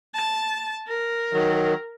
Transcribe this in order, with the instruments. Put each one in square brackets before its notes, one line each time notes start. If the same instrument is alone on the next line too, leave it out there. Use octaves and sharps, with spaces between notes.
[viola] A5
A#4
[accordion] D#3 F#3